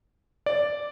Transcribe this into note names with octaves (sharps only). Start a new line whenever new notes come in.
D5